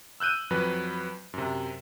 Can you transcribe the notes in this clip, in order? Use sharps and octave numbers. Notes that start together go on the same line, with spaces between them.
E6 F#6 G6 D#7
F2 F#3 B4
F#2 C3